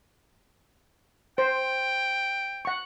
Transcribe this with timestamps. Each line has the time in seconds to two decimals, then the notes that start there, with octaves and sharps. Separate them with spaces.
1.38 C5 G5
2.65 F#5 C#6